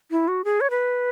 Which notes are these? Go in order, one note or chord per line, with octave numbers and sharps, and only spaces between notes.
E4
F#4
G#4
C#5
B4